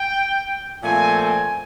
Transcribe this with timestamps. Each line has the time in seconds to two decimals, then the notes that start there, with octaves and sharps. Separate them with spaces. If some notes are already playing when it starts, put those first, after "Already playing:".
Already playing: G5
0.83 A#2 F3 A3 C4 G#5
1.20 G#5